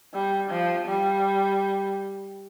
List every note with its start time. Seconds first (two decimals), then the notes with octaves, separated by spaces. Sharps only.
0.13 G3
0.50 F3
0.87 G3